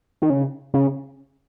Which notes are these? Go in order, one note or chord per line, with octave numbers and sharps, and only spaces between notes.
D#3
C#3
C#3